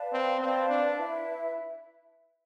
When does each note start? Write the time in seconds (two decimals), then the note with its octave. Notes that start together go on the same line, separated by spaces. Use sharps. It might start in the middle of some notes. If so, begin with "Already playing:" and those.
Already playing: B4 D5 F5 A5
0.13 C4
0.41 C4 B4 D5 F5 A5
0.70 D4
0.97 E4 B4 E5